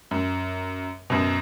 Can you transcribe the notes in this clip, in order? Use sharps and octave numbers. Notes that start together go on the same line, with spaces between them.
F#2
F#2 B2